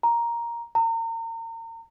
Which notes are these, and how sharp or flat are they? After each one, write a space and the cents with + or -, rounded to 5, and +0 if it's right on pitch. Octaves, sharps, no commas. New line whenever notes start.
A#5 +5
A#5 -35